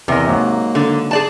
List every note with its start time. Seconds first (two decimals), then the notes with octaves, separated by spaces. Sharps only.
0.08 E2 C3 A#4 D#5
0.28 G#2 F#3 A#3
0.75 D3
1.11 G#4 D5 A5